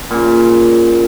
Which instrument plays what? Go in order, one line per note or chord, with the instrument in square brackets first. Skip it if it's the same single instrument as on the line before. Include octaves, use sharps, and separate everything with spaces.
[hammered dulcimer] A#2 C#3